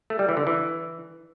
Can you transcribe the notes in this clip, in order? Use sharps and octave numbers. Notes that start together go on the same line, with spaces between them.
A3
G3
E3
D3
E3